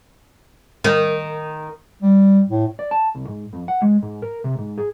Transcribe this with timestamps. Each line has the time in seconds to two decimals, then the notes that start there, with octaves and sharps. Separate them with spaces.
0.84 D#3
2.03 G3
2.49 A2
2.79 D5
2.91 A5
3.15 C2
3.28 G#2
3.53 F2
3.68 F#5
3.82 G#3
4.02 G#2
4.22 A#4
4.44 C3
4.58 G#2
4.78 G#4